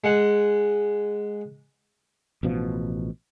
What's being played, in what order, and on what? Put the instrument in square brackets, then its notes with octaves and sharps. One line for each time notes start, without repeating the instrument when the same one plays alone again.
[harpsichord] G#3 F#5
[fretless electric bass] A1 B2 F3